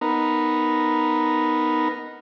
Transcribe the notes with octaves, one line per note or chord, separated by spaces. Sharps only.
B3 D#4 A#4